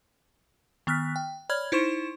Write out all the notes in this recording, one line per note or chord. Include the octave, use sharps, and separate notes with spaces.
D#3 B3 F6 F#6 B6
G5
C#5 D5 B5 F6 G#6
D#4 E4 C5 C6 C#6 E7